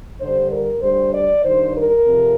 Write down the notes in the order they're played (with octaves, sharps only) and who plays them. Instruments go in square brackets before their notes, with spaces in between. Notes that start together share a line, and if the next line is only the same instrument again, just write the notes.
[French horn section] G2 D3 G3 C5
A#4
D2 D3 G3 C5
D5
G2 D#3 G3 C5
A#4
F2 C3